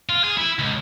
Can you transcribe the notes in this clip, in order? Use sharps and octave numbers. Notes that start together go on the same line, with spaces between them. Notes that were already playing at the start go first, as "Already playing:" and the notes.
F4
G#4
E4
C#2